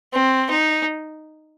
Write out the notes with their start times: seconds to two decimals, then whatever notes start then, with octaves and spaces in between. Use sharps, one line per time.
0.13 C4
0.50 D#4